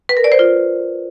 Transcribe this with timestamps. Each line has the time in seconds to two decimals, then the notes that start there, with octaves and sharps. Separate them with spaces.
0.09 B4
0.17 A#4
0.24 D5
0.32 C5
0.39 F4